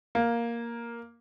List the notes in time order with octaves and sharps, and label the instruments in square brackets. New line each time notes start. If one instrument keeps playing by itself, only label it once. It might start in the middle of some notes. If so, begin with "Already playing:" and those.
[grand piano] A#3